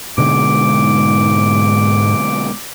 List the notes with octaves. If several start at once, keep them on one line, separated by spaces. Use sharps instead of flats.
G#2 B2 D3 G#3 D6